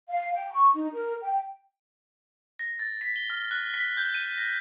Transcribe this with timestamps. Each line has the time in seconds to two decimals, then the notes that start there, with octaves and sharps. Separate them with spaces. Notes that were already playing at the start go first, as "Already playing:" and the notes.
0.09 F5
0.33 G5
0.52 C#6
0.74 D#4
0.93 A#4
1.22 G5
2.59 A#6
2.79 A6
3.01 B6
3.16 G7
3.30 F6
3.51 F#6
3.74 B6
3.97 G6
4.14 D#7
4.38 A#6